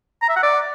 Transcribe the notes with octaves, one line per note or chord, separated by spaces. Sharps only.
A#5
E5
F#5
D5